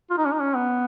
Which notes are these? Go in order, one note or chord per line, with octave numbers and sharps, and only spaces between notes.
F4
D#4
C#4
D#4
C#4
B3